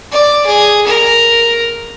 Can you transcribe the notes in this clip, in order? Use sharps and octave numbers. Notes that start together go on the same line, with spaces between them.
D5
G#4
A#4